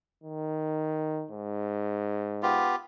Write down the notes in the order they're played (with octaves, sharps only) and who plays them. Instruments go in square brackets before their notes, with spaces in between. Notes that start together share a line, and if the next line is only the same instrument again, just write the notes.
[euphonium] D#3
G#2
[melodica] B3 F4 G4